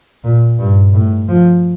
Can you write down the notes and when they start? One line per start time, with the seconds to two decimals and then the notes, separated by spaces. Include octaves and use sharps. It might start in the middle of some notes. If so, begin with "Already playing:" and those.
0.24 A#2
0.59 G2
0.93 A2
1.28 F3